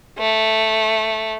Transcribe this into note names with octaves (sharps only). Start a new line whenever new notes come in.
A3